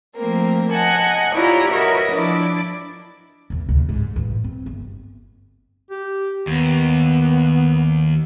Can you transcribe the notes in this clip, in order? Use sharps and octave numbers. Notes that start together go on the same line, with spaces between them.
F3 A3 A#3 C4 A#4
D#5 F#5 G#5 A5
E4 F4 G4 C#5 D5 A#5
F#4 A#4 B4 C#5 D#5 E5
F3 D4 E4 D6 A6
B1 E2
D2 C3
G#2
A1 F#2
C4
G1
G4
D#2 B3